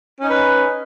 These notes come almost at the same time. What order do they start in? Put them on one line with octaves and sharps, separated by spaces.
C#4 D#4 B4